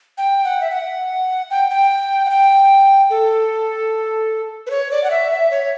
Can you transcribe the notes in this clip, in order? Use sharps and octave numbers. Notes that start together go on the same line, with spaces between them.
G5
F#5
E5
F#5
G5
G5
F#5
G5
A4
B4
C#5
D5
F#5
E5
E5
C#5